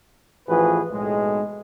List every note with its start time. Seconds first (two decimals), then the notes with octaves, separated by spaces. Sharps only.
0.48 A1 E3 F3 F#4 G#4 B4
0.91 B1 A2 G#3